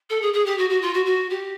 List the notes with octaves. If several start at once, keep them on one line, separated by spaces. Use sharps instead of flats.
A4
G#4
G#4
G4
F#4
F#4
F4
F#4
F#4
G4